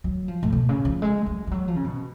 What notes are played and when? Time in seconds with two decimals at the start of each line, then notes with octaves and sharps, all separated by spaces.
0.04 F#3
0.28 F3
0.43 A2
0.53 B2
0.69 C#3
0.85 F3
1.02 G#3
1.26 F#3
1.47 F3
1.51 F#3
1.68 F3
1.76 C#3
1.84 B2